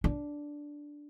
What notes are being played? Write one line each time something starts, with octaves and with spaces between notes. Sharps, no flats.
D4